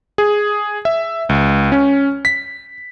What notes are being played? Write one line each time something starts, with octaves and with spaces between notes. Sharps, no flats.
G#4
E5
C#2
C#4
B6